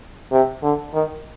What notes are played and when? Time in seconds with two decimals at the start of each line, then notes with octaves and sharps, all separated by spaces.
0.32 C3
0.63 D3
0.93 D#3